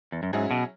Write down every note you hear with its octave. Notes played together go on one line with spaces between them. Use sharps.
E2
F#2
G#2 F#3 C#4 E4 G#4
B2